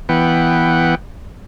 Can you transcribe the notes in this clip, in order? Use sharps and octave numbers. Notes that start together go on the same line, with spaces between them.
E3 B3 F#5 G5